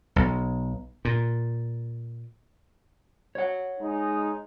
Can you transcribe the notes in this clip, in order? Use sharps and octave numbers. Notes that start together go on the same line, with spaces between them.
B1
A#2
C#5 F#5
G#3 D#4